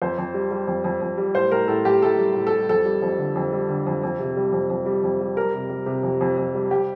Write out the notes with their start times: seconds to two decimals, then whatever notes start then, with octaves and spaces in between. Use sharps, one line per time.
0.02 F2 C5
0.18 F2
0.34 G3
0.51 G3
0.67 F2
0.84 F2
1.01 F2
1.18 G3
1.35 A2 C5
1.52 A2 A#4
1.68 A2 A4
1.85 A2 G4
2.02 A2 A4
2.18 G3
2.36 A2
2.47 A4
2.52 G3
2.69 F2 A4
2.85 G3
3.02 F2
3.18 D3
3.36 F2
3.52 G3
3.69 D3
3.87 F2
4.03 F2
4.19 C3
4.37 G3
4.53 F2
4.70 F2
4.86 G3
5.03 F2
5.20 G3
5.36 G3 A#4
5.54 C3
5.69 G3
5.86 C3
6.03 F2
6.21 F2
6.38 F2
6.54 G3
6.70 G3 G4